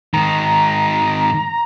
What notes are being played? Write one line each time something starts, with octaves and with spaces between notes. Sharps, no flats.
G#2 D#3 A#5